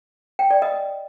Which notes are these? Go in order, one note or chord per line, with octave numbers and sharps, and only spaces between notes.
G5
D5
D#5